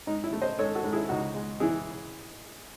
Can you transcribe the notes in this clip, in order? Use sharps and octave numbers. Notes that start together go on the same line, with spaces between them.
G#2 D#4
E4
A3
C5 D#5
G#2 A4 C#5
F#4 A4
G#2
E4 G#4
C#2 D#4 F#4
G#3
E3 E4 G#4